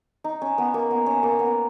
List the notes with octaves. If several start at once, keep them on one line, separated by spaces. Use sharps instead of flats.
D#4
C#4
B3
A#3
B3
C#4
A#3
B3